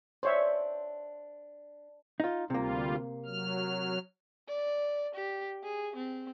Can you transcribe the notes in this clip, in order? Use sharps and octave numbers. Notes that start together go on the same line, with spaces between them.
D4 C5 C#5 E5
D#4 F4
D2 C3 G3 A#3 F4
F#3 F6
D5
G4
G#4
C4